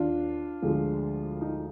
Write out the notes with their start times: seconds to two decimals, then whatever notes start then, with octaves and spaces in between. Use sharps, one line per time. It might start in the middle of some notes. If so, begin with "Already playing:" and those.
Already playing: D#2 D#3 D4 F4
0.62 D2 D3 F3 G#3
1.41 D#4